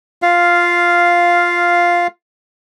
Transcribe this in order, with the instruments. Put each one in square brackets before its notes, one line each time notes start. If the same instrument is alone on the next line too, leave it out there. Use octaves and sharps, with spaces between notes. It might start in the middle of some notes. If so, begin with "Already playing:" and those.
[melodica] F4 F5